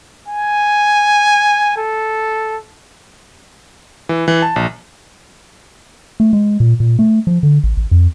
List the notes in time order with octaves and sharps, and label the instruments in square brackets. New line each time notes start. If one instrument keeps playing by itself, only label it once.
[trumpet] G#5
A4
[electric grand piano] E3
E3
A5
A#1
[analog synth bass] A3
G#3
A#2
A#2
A3
F3
D3
A1
A1
F2